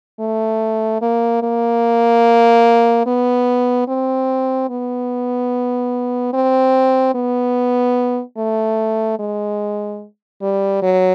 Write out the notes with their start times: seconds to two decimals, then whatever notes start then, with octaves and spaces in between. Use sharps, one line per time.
0.20 A3
1.01 A#3
1.43 A#3
3.06 B3
3.88 C4
4.70 B3
6.33 C4
7.15 B3
8.38 A3
9.19 G#3
10.42 G3
10.83 F#3